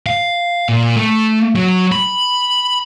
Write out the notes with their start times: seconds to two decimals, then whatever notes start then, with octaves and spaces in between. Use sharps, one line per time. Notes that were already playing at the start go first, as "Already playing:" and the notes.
0.06 F5
0.69 A#2
0.97 A3
1.55 F#3
1.92 B5